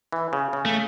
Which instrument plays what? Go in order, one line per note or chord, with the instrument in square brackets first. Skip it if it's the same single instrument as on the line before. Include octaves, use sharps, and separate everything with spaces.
[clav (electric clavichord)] E3
C#3
C#3
[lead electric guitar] A3